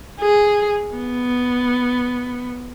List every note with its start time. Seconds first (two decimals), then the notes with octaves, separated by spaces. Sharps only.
0.20 G#4
0.97 B3